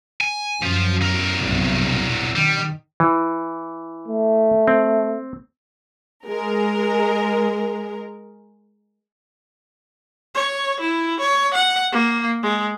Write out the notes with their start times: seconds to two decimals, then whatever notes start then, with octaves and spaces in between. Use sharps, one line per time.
0.21 G#5
0.62 F#2 F3 F4
1.01 E2 A#4
1.40 B1 G2 C3
2.35 D#3 G3
3.00 E3
4.08 A3
4.68 C4
6.27 G#3 A#4
10.35 C#5
10.80 E4
11.20 C#5
11.54 F#5
11.92 A#3
12.43 G#3